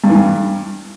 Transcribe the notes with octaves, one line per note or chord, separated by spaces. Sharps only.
G2
E3
G2